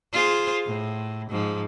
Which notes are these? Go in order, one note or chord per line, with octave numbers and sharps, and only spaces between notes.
F4 G#4 C5
A2
G#2 F3